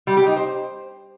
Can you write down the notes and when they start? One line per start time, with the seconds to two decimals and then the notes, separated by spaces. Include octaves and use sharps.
0.07 G3
0.17 G4
0.27 D#4
0.36 C5